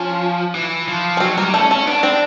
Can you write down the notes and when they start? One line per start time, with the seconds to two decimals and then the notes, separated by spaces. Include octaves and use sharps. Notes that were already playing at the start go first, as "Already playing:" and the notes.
Already playing: F3 C#4
0.55 E3
0.88 F3
1.17 C#4
1.20 F#3 C4
1.38 G3 A#3
1.53 A3 C#4
1.70 A3 C#4
1.87 B3 D4
2.03 C4 D4